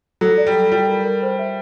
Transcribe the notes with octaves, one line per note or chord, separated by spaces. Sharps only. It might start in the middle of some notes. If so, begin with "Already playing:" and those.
F#3 A4
D5
G3
A4
G3 F4
A#4
A#4
C5
E5